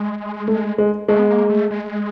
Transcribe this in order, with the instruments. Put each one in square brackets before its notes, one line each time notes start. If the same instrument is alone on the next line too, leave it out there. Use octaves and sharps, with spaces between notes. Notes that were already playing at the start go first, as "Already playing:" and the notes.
Already playing: [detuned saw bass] G#3
[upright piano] A3
G#3
[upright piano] G#3 [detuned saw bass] A3
[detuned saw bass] B3
A#3
A3
G#3